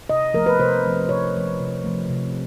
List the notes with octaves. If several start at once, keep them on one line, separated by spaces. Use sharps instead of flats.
C3 D#5
F3 A3 A#4
B4
C3 C5
F3 A3
C3 C#5
F3 A3
C3
F3 A3
C3